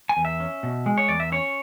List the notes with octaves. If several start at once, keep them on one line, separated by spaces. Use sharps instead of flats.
G#5
E2
E5
C#4
B2
G#3
C#5
E2 D5
E5
C#4 C#5